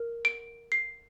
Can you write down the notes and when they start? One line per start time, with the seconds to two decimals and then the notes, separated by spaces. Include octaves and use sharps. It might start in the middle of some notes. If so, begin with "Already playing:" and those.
Already playing: A#4
0.25 D7
0.72 C7